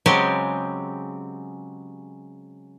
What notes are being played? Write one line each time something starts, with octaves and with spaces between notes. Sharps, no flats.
C#3 F#3 G#3 C4 G4